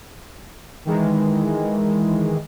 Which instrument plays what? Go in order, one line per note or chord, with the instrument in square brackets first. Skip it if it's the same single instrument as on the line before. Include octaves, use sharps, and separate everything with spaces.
[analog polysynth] D#3 E3 G#3